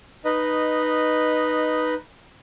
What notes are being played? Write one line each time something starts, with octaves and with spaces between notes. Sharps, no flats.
D#4 B4 D#5